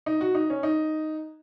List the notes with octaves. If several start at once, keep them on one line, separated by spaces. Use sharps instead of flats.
D#4
F#4
D#4
C#4
D#4